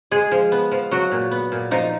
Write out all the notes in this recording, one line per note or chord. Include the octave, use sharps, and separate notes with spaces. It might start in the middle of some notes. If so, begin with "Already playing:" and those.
G#3 G#4
F3
B3
F3
F#3 F#4
A#2
B3
A#2
F3 D#4